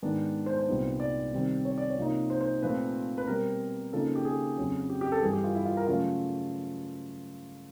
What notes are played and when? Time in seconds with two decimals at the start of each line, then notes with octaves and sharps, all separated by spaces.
0.02 G#2 D#3 G#3 B3 D4
0.46 C5
0.57 C5
0.67 C2 A#2 G3 B3 D#4
1.00 D5
1.33 C3 D#3 G3 C4
1.65 C#5
1.78 D5
1.90 C#5
1.98 C3 F3 A#3 D#4
2.30 C5
2.41 C5
2.63 A#2 F3 A3 C4 B4
3.18 B4
3.27 B2 G3 C4 A#4
3.93 C#3 F3 A#3 D#4 A4
4.16 G4
4.25 G#4
4.58 F2 C#3 F#3
4.90 G4
5.01 G4
5.12 A4
5.22 G2 E3 G3 G#4
5.33 G4
5.44 F4
5.55 E4
5.66 F4
5.77 A#4
5.87 C#3 F#3 A3 F4